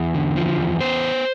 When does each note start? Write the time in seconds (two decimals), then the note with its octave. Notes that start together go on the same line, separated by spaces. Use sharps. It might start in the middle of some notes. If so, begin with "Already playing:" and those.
Already playing: E2
0.14 D3
0.36 F3
0.58 E2
0.81 B3 C5